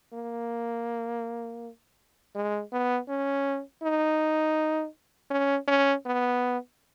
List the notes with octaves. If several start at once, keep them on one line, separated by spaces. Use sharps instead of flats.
A#3
G#3
B3
C#4
D#4
C#4
C#4
B3